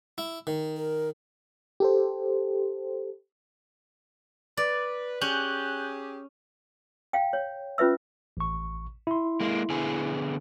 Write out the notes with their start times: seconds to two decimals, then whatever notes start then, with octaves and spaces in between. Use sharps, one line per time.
0.18 E4
0.47 D#3
0.77 A#4
1.80 G4 A4 C5
4.57 B4 D5
5.21 C#4 G4 G#4 F#6 G6
7.13 F5 G5
7.33 C#5
7.78 C#4 F4 B4 E5 E6
8.37 A1 C#6
9.07 E4 C6
9.40 G#3 A#3
9.70 D3 B3 G#4